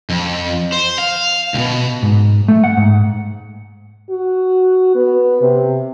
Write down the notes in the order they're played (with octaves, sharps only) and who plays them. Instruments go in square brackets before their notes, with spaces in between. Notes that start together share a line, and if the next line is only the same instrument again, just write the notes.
[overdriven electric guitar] F2
C5
F5
C#2 B2
[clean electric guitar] G#2
A3
F#5
G#2
[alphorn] F#4
B3
C3